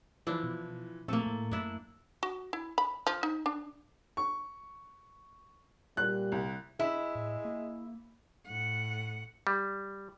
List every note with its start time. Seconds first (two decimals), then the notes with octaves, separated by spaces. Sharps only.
0.27 E3 F3 D4 E4
0.44 B2
1.08 A#2 F3 A3 A#3 C4 A4
1.26 A2
1.51 F#2 D4 E4
2.23 F#4
2.53 E4
2.78 B5
3.07 F3
3.23 D#4
3.46 D4
4.17 C#6
5.97 A#2 G3 F#6
6.32 C2
6.80 G#3 E4 E5
7.15 A2
7.45 A#3
8.47 A2 F#5
9.47 G3